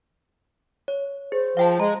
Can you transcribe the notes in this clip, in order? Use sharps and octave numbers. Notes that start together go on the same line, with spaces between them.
C#5
G#4 C5
F3 F5 G5 A5
G#3 A#5